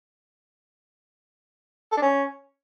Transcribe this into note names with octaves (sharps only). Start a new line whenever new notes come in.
A4
D4
C#4